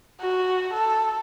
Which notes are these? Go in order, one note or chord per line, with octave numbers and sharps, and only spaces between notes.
F#4
A4